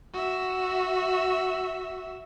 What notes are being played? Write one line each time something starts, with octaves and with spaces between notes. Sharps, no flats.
F#4 E5